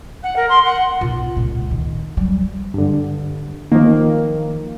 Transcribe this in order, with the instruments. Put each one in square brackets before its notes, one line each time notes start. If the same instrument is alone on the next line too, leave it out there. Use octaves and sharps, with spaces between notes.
[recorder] F#5
A#4
C6
F#5
[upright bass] B1 F4
C#2 A#2
A#2 D#3
F#3 G3
[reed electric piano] G2 D3
[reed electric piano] D#3 F3 [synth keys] A#3